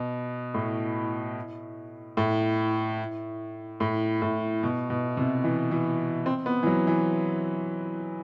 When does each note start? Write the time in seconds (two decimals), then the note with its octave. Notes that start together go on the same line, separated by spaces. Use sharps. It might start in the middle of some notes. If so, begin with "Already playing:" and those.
Already playing: B2
0.54 A2
2.17 A2
3.80 A2
4.22 A2
4.63 B2
4.90 B2
5.17 C3
5.44 E3
5.71 E3
6.26 C4
6.46 B3
6.63 E3
6.67 F#3
6.87 E3